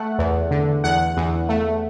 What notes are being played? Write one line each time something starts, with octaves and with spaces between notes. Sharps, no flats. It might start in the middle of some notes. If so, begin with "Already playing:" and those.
Already playing: A3 F#5
E2
D3
E2 F#5
E2
A3